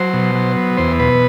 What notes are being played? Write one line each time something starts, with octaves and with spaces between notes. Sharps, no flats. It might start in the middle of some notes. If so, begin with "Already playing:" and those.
Already playing: F#3 C5
B2
F#3
B3
E2 C5
B2 B4